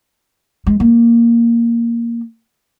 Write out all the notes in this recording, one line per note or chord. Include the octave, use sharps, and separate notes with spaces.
G#3
A#3